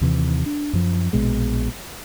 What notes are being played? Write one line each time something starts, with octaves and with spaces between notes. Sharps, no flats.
D#2 C3 E3
D4
F#2 F3
A#1 B2 G#3